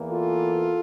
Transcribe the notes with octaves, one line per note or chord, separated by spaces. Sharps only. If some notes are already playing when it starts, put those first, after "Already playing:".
Already playing: E2 E3 A#3
F4 A4